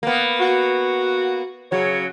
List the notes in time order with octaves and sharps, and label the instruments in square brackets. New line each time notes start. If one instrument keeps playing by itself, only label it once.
[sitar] A#3 B3
[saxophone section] F#4
[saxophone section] C#3 C#5 [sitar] F#3